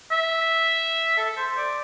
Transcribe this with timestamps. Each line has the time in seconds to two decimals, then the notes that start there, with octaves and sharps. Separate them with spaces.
0.11 E5
1.17 A4
1.37 C5
1.57 D5